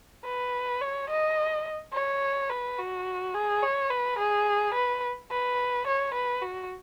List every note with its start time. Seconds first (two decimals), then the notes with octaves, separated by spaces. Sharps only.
0.25 B4
0.81 C#5
1.10 D#5
1.93 C#5
2.50 B4
2.78 F#4
3.34 G#4
3.63 C#5
3.91 B4
4.19 G#4
4.75 B4
5.31 B4
5.87 C#5
6.14 B4
6.42 F#4